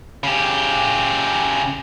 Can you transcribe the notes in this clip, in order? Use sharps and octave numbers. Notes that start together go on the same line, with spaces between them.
C#3 G4